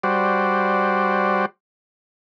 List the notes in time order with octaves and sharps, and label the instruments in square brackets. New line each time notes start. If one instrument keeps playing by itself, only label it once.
[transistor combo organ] G3 F#4 C5 D5